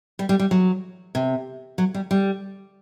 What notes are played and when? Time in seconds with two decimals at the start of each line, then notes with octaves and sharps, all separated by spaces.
0.19 G3
0.29 G3
0.40 G3
0.51 F#3
1.15 C3
1.78 F#3
1.94 G3
2.11 G3